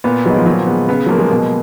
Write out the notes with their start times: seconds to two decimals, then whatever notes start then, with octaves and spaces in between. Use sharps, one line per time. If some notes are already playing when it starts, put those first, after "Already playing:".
0.04 A#2 B3
0.25 F#3 G#3 B3 D#4
0.36 F3
0.46 A#2 F#3
0.67 G#3 B3
0.88 C#3 B3
1.06 F3 F#3 A#3
1.18 G#3
1.30 B2 A#3